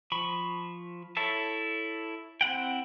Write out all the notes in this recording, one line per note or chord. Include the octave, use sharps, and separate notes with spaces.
F3 B5 C#6
E4 A4 C#5 E5 A5
C4 E4 F#5 G5